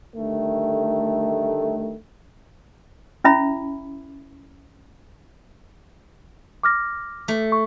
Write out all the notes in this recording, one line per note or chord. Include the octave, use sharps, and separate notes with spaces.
D3 D#3 G3 A3
C#4 E4 E5 B5
D6 F6 A#6
A3
C#6